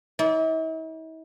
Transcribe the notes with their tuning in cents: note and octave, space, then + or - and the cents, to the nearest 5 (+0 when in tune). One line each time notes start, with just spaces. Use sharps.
E4 -45 D5 -30